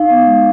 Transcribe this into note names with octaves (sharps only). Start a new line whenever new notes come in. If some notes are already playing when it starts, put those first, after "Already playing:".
Already playing: D#4 F5
B3
G#3